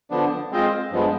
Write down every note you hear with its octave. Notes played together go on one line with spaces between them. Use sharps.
D3 F3 B3 D4
G#3 C4 F4 C5 D#5
G2 F3 G#3 B3